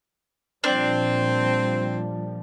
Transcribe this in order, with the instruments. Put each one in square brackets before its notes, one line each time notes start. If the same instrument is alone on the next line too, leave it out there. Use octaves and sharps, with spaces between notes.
[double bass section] A#2 F3 G3 [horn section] C4 [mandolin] D4